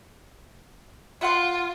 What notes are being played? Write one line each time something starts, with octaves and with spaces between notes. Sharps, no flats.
F4 E5 F#5 C6